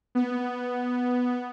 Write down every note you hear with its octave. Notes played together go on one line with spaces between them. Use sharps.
B3